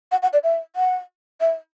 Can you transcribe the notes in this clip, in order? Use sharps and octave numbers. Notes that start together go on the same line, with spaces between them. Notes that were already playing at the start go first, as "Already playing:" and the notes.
F#5
F#5
D5
E5
F#5
E5